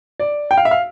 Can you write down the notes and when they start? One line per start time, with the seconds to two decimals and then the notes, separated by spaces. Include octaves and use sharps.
0.20 D5
0.51 G5
0.57 F5
0.65 E5
0.71 F5